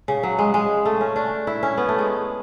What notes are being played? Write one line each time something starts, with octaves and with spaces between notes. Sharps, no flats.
C#3
F#3
G#3
G#3
A3
C#4
D4
E4
C#4
B3
A3
G#3